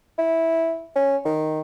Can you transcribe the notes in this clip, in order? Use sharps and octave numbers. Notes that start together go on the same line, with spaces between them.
E4
C#4
D#3